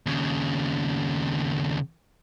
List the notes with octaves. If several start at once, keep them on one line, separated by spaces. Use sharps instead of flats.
D#2 C#3